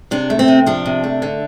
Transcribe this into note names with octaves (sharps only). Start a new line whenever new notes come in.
C3 D4
A3
C4
C3
F3 D4
C3
A3
D3